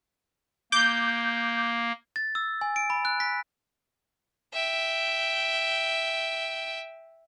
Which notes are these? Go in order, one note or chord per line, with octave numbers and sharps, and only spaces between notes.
A#3 D6 G6
A6
E6
G#5
D7
B5
F#6
B6
E5 G5